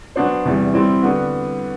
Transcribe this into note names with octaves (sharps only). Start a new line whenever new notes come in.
F#3 B3 D4 F#4 C5
E2 C3 E3 G3
G3 C4 E4
D3 G3 B3 F#4